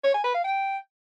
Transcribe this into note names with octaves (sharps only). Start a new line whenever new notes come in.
C#5
G#5
B4
F5
G5